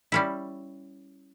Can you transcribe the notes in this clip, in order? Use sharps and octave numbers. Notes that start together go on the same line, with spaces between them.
G3 C#4 E4